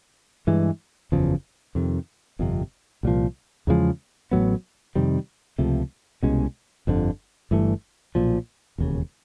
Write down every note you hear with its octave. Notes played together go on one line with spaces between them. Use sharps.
G2 E3 G#3
F#1 E2 C#3 F3
F2 C3 D#3
G1 F2 C3
C2 A#2 F3
E2 C#3 F3 G#3
A1 A2 F#3 B3
F2 C3 D#3 G3
C#2 C3 F3 A3
C2 B2 G#3 C#4
G1 F2 D3
G1 G2 E3 A3
B1 A#2 F3
E1 D#2 C#3